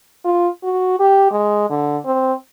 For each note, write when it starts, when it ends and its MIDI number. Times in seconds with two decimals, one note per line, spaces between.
0.25 0.48 65
0.63 0.95 66
1.00 1.27 67
1.31 1.65 56
1.70 1.98 50
2.05 2.33 60